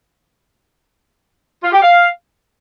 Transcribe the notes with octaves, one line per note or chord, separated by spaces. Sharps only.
F4
G4
F5